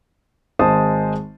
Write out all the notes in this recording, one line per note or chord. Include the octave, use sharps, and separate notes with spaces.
G#1 G#3 C5 A5 D#6